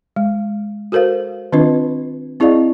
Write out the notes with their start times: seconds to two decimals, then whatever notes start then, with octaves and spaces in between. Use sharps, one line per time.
0.16 G#3
0.92 F#4 A4 A#4 C5 F5
1.52 D#3 C4 D4 F4 B4 D#5
2.40 C4 E4 G#4 D5 D#5 F5